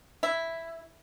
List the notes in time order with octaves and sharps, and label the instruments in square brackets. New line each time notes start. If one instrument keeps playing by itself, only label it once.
[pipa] E4